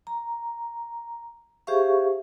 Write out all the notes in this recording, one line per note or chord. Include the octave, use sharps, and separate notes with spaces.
A#5
G4 G#4 C5 E5 F5 C#6